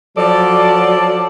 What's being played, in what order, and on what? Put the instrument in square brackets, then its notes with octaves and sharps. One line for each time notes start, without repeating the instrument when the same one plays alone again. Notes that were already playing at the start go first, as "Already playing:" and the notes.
[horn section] F3 F#3 A4 D5